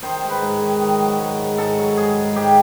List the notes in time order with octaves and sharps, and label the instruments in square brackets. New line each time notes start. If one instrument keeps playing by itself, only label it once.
[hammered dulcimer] D#3 C5
G#2
B4
G#2
D#3
D#3
F#3
G#2
G#2
G#2 A4
F#3
G#2 G#4
G#2
G#2 G4